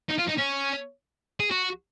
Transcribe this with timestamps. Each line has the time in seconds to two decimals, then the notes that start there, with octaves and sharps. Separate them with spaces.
0.10 D#4
0.19 F4
0.29 D#4
0.38 C#4
1.40 G#4
1.51 F#4